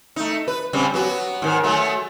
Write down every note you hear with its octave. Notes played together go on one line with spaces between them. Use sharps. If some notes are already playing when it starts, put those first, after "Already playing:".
A3 D#4
B4
C#3 G3 C4
F#3 B3 F#4
G#2 D#3
F#3 G#3 A3